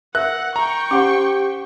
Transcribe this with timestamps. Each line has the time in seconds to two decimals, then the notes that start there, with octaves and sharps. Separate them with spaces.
0.15 A#4 E5 F#5 F#6
0.56 G5 A#5 C#6
0.91 C#4 G4 C5 F#5 C6 D6